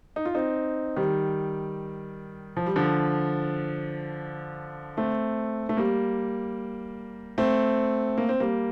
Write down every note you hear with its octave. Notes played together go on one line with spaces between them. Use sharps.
D#4
F4
C4 D#4
D#3 G3
F3
G3
D3 F3
A3 C4
A3
G3 A#3
A3 C4
A#3
C4
G3 A#3